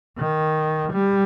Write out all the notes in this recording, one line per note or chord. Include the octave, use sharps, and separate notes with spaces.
D#3
G3